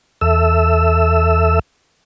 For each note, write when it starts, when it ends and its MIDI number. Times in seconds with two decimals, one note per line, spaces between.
0.21 1.59 40
0.21 1.59 69
0.21 1.59 76
0.21 1.59 88